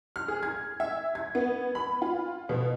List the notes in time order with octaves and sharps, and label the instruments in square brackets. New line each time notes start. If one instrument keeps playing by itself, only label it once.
[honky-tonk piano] F6
G#4
G#6
E5
G#6
B3
B5
F4
B2